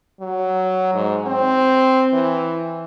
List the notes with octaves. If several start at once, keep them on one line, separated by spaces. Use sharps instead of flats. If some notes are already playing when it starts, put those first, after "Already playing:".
F#3
G#2
C4
E3